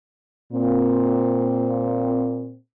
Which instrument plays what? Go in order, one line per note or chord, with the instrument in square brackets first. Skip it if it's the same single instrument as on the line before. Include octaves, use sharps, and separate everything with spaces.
[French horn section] A#2 C4